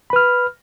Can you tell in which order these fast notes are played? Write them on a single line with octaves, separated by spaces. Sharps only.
B5 B4 F6